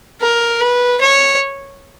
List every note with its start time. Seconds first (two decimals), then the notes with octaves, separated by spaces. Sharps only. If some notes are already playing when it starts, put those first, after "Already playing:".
0.21 A#4
0.60 B4
1.01 C#5